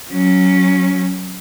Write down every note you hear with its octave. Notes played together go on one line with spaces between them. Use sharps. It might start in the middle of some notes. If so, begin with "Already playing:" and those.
F#3 C#4